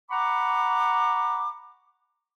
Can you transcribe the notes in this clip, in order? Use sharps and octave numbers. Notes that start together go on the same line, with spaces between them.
F#5 A#5 B5 C#6 D6